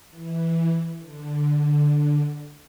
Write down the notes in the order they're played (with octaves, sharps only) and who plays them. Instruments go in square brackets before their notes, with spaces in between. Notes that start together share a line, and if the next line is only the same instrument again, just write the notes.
[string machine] E3
D3